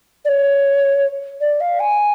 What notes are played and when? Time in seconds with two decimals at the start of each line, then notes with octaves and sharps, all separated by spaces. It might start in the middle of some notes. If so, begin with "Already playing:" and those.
0.25 D5
0.28 C#5
1.40 D5
1.60 F5
1.79 G#5